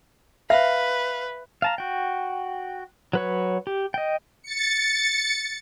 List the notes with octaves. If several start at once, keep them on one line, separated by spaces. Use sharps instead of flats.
B4 E5 F5
F5 A5 A#5
F#4 G5
F#3 B4 C#5
G4
D#5 G5
A6 C#7